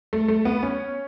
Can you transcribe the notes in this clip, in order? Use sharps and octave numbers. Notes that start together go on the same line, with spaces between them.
A3
A3
B3
C#4